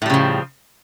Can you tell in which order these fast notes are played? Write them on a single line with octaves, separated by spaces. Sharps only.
A2 G3 C#3 F3